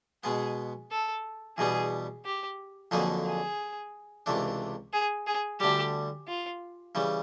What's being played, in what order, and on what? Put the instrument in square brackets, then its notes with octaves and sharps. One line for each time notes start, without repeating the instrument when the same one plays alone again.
[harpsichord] B2 G#3 B3 [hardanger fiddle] G#4
[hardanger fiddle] A4
[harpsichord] E2 B2 G3 B3 [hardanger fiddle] G#4
[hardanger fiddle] G4
[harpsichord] F2 D3 F#3 A#3 D#4 [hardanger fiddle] G#4
[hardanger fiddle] G#4
[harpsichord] C#2 C3 E3 A3 D4
[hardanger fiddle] G#4
G#4
[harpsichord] D2 D3 G3 [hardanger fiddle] G4
[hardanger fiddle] F4
[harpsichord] C#3 E3 G3